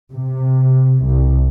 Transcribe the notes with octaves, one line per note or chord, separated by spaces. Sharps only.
C3
C2